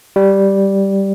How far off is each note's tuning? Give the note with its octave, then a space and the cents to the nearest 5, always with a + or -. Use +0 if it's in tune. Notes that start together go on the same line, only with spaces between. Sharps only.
G3 -5